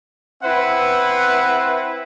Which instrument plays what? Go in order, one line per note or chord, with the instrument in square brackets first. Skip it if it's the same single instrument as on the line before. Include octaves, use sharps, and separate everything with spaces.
[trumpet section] C4 E4 B4 E5 F#5